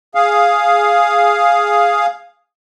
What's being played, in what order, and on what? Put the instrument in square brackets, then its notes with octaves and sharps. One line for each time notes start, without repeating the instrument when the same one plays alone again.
[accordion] G#4 F5